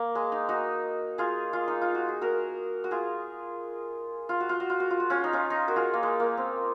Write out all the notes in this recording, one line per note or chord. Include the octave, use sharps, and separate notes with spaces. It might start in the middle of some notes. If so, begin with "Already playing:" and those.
Already playing: A#3
G#3
D#4
D#4 F#4
F4 G#4
F4 G#4
D#4
F4
F#4
G#4
F#4 A#4
F#4
F4 G#4
F4
F#4
F4
F#4
F4
F#4
F4
F#4
C#4 F4
D#4
C#4 F4
D#4
F#4 A#4
F4 G#4
A#3
G#3
A#3
C4